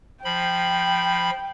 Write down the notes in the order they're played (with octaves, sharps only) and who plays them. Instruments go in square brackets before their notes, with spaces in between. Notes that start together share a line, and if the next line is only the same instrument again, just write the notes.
[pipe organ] F3 B5 [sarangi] G5